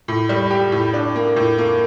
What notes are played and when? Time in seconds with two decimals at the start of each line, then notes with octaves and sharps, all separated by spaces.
0.08 A2
0.29 G3
0.50 G4
0.72 A2
0.93 D4
1.16 A#3
1.36 A2
1.58 A#3